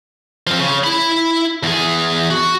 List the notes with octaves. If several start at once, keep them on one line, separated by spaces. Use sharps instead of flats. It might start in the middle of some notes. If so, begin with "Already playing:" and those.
F3 C4
C#3
E4 B5
E2 G#4
F#4